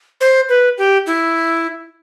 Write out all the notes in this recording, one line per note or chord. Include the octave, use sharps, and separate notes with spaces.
C5
B4
G4
E4